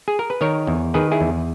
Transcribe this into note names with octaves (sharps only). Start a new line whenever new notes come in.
G#4
A#4
B4
D#3 A#4 C#5
E2
D#3 G#4 B4
E4 G#4
E2